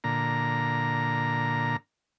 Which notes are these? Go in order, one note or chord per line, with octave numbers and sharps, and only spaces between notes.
A#2 D3 A#5